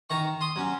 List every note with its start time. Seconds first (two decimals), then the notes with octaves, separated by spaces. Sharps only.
0.10 D#3 A#5 C#6
0.41 C6 D#6
0.56 F#3 C#4